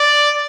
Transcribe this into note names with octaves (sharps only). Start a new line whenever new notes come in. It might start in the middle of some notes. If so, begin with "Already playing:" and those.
Already playing: D5